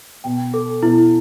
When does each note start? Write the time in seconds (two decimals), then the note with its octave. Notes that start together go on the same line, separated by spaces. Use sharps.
0.24 B2 G5
0.54 A4
0.82 B2 E4